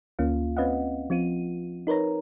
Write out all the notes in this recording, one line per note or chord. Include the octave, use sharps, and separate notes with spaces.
D2 A#3 C#4 F4 F5
C4 C#4 B4 D#5 F5 F#5
F3 C4 F4 D#7
D#4 A#4 B4 C#5 A#5